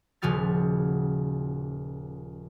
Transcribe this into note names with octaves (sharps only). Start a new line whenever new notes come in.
D#1 C#3 F3 F#4 F6 A6